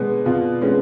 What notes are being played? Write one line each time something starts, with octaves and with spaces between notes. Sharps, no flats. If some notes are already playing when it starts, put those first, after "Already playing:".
Already playing: B2 G#3 B3 D4
B2 F4
G#3 B3 C#4